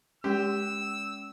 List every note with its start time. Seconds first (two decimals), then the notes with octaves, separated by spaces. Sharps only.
0.24 G#3 C#4 G4 E6